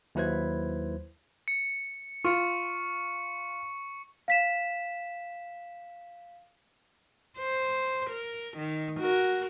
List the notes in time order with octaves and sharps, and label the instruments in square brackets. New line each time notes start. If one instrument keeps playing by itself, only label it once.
[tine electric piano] D#2 F#3 E4 B4 C5 G#6
[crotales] C#7
[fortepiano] F4 [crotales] C#6 C#7
[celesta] F5 B6 E7
[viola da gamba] C5
A#4
D#3
F#4 A#4